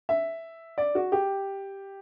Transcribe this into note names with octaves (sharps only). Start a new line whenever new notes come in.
E5
D5
F#4
G4